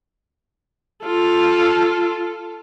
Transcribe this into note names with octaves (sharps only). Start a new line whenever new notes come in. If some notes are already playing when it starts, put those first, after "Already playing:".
F4 A4